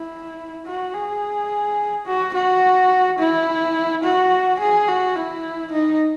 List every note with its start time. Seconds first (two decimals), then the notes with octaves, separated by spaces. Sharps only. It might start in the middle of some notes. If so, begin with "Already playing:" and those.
Already playing: E4
0.66 F#4
0.94 G#4
2.07 F#4
2.34 F#4
3.19 E4
4.04 F#4
4.60 G#4
4.88 F#4
5.16 E4
5.72 D#4